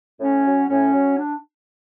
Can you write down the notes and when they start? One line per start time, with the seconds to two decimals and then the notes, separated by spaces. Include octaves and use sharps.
0.21 A2 C#4
0.45 F#3
0.69 A2 C#4
0.93 F#3
1.17 D4